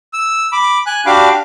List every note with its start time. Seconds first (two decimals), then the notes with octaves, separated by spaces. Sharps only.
0.13 E6
0.52 B5 D6
0.86 G#5 F#6
1.06 D4 F#4 G4 F5 B5 D6